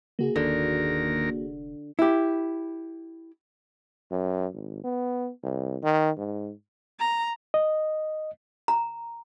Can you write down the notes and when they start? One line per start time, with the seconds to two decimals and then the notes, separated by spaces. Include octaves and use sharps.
0.19 C#3 A#3 F#4 G#4
0.36 F1 D#2 D3 A#4
1.99 E4 G4
4.11 F#2
4.53 G#1
4.84 B3
5.43 C2
5.83 D#3
6.17 G#2
6.99 A#5
7.54 D#5
8.68 A#5